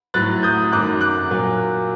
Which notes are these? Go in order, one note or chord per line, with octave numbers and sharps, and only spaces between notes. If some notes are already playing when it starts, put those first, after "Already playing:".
A2 F#3 F#6 A6
D#6 G6
F#2 D#3 F#3 D6 F#6
D6 F#6
A#2 F#3